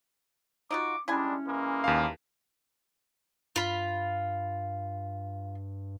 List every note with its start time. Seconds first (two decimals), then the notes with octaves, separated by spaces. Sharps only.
0.71 D#4 F4 F#4 D6
1.08 G3 G#3 C#4 D4 E4 G#5
1.46 E3 G#3 A#3
1.84 D#2 F5
3.56 G2 F4 B5